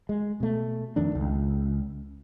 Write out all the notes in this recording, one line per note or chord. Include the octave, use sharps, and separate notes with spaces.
G#3
B2 A3
F2 D#3 A3 D4
C#2